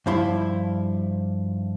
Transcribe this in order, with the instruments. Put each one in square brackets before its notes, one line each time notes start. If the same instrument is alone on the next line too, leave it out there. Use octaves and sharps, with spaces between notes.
[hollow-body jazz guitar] G2 F3 E4 C6